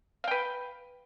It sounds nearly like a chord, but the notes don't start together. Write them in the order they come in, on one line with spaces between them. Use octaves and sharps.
F5 G5 B4